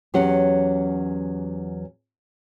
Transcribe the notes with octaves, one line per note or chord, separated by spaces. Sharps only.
E2 F#3 C#4 G4 F#5